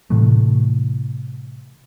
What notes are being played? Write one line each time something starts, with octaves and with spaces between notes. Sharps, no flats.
A2 C3 E3 A3